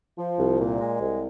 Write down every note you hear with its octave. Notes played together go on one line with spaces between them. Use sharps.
F3
C2
A#2
G#3
C2